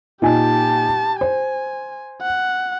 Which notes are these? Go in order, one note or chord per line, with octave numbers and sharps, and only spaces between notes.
A#2 D#4 G4 G#5 A5
C5 G#5
F#5